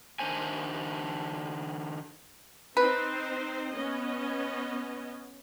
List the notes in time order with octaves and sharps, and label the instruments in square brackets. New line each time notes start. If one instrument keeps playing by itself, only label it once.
[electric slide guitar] D#3 G#3 D4 C5 G#5
[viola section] C4 D#4 C5 [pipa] B4
[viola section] B3 C#4 D#5